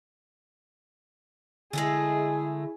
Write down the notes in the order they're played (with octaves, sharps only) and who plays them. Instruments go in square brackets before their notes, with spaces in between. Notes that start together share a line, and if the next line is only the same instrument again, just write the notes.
[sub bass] D3 [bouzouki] G#3 A3 A4 [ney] E4 [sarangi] G#4